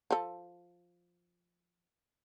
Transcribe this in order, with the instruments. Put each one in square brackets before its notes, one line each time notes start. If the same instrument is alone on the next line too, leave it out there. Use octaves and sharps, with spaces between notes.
[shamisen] F3 A4